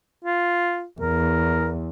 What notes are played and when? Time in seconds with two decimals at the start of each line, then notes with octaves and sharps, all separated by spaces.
0.25 F4
1.01 E2 A#4